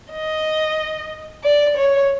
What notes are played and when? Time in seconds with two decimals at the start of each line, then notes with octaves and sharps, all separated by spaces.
0.11 D#5
1.43 D5
1.76 C#5